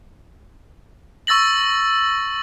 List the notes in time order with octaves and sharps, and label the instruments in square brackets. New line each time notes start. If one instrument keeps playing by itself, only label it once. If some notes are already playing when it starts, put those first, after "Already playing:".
[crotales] C#6 E6 A6 A#6 F#7